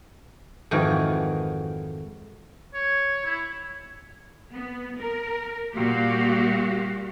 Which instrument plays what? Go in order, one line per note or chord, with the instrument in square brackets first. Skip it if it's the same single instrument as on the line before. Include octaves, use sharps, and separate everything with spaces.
[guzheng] F2 G#2 D#3 E3 F#4
[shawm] C#5
E4
[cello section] B3
A#4
A#2 G3 F#4 G4 F5